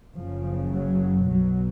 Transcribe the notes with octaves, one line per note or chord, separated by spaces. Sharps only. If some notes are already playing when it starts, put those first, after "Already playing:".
F#1 F#2 C#3 F3
F#3
B1 B2 F#3